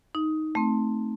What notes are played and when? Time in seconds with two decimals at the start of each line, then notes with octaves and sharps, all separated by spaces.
0.15 D#4
0.55 A3 C4